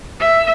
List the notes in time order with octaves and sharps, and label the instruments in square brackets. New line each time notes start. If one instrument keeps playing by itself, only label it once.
[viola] E5